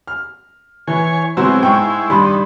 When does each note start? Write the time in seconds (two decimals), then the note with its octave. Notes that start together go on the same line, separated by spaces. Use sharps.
0.07 F6
0.88 E3 C#5 G#5
1.37 C3 F#3 G#3 B3 E4 F#4 C5
1.63 G#2 G5 C#6
2.10 G2 D#3 D4 B5 C6